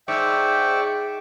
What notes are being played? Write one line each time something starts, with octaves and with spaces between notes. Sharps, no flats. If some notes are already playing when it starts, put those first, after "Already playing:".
G#2 D5 E5 G5 C#6